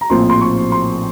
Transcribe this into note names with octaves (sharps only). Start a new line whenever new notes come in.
A#5
A#1 A2 F3 C4 C6
C6
C#6
C6